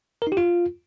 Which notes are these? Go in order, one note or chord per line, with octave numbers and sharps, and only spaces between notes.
A#4
D#4
G4
F4